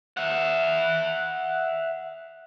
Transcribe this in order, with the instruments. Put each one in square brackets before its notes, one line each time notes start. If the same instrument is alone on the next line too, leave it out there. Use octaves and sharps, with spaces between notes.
[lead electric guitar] E5 F#5